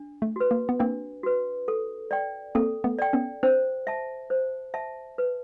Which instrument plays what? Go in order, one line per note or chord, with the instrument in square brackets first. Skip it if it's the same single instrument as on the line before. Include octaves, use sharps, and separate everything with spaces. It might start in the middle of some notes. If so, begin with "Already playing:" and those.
Already playing: [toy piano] D4
[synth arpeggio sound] A3
[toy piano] F#4 B4
[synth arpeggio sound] A#3
B3
[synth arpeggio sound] A#3 C4 [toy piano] D4
[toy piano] F#4 B4
A4
D5 G5
[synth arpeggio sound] A#3 C4 [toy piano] A4
[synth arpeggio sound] A3 B3
[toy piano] D5 G5
[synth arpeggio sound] B3 C#4
[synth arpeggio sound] C4 D4 [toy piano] C5
[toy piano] E5 A5
C5
E5 A5
B4